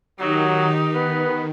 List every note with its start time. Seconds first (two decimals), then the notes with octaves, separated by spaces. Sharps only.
0.20 D#3 F#3 D#4 G4
0.95 B3 B4